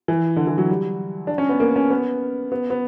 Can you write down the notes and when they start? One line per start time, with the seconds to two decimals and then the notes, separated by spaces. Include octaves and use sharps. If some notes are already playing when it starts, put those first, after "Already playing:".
0.08 E3
0.37 D3
0.47 E3
0.58 F#3
0.69 G3
1.27 D4
1.38 C#4
1.49 B3
1.60 A#3
1.76 C#4
1.90 B3
2.52 B3
2.70 B3